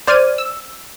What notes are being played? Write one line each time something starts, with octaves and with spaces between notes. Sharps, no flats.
C5 D5 F6 G#6 D#7
E6